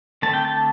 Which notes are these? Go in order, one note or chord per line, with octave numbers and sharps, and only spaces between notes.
D3 A3 C4 A5
G5
A5